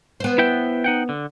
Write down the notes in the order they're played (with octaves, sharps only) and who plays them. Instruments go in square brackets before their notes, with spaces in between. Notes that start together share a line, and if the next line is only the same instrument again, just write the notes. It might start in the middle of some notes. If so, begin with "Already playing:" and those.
[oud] B3 C5
[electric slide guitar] E4 E5 G5
D#4 F#5 G5
D3